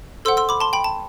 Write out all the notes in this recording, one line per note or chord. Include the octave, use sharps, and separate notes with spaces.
A4 C5 F#5 C6 E6
C6 E6
B5 D6
A5 C6
G5 B5
A5